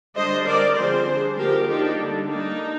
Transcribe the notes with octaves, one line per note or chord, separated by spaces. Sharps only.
D3 G3 D4 C5 D#5
G3 C4 A#4 D5
D3 F3 C4 G#4 C5
G3 D4
D3 F3 A#3 G4 A#4
F3 A#3 D4 D#4 G4
D3 G3 D4
G3 A#3 D4 D#4